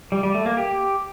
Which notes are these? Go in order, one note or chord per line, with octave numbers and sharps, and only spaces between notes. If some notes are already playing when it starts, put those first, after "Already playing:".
G3
G3
A3
A#3
G4